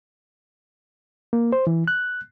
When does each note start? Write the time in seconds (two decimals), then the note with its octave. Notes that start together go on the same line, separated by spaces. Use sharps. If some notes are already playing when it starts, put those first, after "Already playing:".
1.33 A#3
1.53 C5
1.67 E3
1.88 F#6